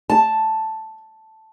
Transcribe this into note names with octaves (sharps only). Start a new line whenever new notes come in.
A5